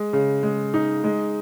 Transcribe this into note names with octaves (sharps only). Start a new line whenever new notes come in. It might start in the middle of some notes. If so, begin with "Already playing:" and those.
Already playing: G#3
C#3
G#3
D#4
G#3